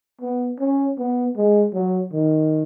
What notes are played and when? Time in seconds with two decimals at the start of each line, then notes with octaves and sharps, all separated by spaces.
0.21 B3
0.60 C#4
0.98 B3
1.36 G#3
1.73 F#3
2.12 D#3